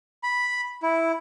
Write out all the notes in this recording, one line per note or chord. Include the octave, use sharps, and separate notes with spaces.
B5
E4